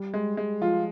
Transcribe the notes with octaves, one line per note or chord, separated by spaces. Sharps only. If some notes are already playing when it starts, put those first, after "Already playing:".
Already playing: G3
G#3
G#3
F3 F4